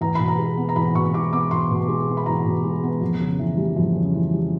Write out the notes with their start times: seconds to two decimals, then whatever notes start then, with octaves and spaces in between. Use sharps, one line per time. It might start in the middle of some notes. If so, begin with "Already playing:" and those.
0.01 E2 A#5
0.15 B2 B5
0.28 A#5
0.39 G#3
0.57 B3
0.69 A#5
0.76 E2 B5
0.95 B2 C#6
1.14 G#3 D6
1.32 B3 D6
1.51 E2 C6
1.71 B2
1.89 G#3
2.08 B3
2.17 B5
2.26 E2 A#5
2.45 B2
2.64 G#3
2.83 B3
3.01 F2
3.20 C#3
3.39 E3
3.57 G3
3.76 F2
3.95 C#3
4.14 E3
4.33 G3